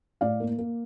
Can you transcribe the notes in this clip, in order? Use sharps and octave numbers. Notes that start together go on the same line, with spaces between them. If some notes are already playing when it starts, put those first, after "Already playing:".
A2 D5 F5
A#3
A#3